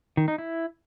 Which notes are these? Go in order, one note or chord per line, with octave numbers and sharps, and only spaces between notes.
D#3
D#4
E4